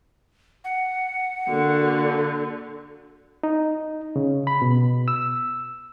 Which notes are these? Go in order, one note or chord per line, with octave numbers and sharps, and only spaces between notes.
F#5
A#2 D3 A#3 F#4
D#4
C#3
B5
B2
E6